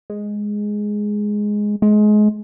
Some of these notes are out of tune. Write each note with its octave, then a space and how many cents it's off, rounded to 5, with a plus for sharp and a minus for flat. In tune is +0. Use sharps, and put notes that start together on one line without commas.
G#3 +0
G#3 +25